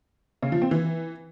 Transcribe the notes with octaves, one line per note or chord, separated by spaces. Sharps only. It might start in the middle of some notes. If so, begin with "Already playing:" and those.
C#3
F3
C4
E3